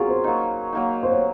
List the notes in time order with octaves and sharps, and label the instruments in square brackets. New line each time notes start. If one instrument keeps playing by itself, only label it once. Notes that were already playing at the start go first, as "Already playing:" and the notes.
Already playing: [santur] F#3 C#4 F4 A#4 [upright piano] F#4 G#4
[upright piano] C5
[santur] F#3 A#3 D#4
F#3 A#3 D#4
[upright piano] C5
C#5